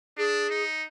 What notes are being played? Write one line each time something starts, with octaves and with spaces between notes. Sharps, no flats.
D4 G#4
D#4